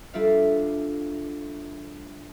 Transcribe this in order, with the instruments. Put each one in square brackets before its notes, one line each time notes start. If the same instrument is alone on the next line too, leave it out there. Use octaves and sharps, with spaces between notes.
[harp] G3 D4 F4 A4 E5 F5